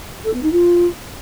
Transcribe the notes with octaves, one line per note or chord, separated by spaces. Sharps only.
A4
B3
D#4
F4